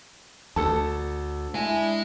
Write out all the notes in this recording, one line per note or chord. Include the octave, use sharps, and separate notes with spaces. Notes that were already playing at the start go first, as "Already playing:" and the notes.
D2 A4 A5
G#3 D4 E4 G#5